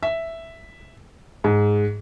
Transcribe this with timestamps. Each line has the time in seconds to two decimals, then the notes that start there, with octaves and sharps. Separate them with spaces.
0.03 E5
1.44 G#2